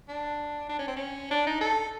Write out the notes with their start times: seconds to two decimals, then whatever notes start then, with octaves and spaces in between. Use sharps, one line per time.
0.09 D4
0.69 D4
0.79 C#4
0.88 C4
0.97 C#4
1.31 D4
1.47 D#4
1.61 A4